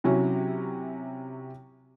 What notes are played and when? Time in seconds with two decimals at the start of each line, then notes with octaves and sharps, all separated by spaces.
0.04 C3 F#3 C#4 E4